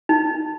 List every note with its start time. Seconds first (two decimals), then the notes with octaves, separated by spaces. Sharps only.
0.09 D#4